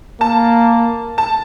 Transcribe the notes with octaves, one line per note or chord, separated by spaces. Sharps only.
A#3 A5
A5